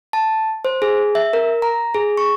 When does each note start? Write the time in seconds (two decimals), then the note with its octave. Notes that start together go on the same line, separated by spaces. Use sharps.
0.13 A5
0.65 C5
0.82 G#4
1.15 E5
1.33 A#4
1.62 A#5
1.94 G#4
2.17 C#6